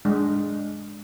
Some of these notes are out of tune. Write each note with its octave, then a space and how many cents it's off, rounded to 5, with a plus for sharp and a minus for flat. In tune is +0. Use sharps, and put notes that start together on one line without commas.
G#3 +0 D4 +0